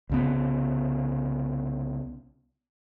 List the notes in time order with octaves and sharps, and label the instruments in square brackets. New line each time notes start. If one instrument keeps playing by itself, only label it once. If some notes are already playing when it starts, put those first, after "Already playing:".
[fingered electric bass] C2 C#3 B3